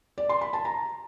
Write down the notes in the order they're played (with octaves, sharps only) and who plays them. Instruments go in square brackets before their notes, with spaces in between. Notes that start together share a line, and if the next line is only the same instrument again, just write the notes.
[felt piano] D5
C6
B5
A5
A#5